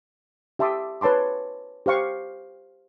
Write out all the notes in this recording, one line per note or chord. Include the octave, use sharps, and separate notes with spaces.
G4 E5 A5 C6 D6 D#6
B4 C#5 A5 C6 D6
G4 C5 F5 C#6